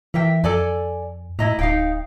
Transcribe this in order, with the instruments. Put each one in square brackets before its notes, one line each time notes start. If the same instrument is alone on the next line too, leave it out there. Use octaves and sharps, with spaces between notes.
[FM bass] E3 [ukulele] A#4 E5 G5
[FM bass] F2 [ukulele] A4 D5 G#5
[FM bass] A2 [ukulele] E4 D#5 A#5
[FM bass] D1 [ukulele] D#4 F5 G5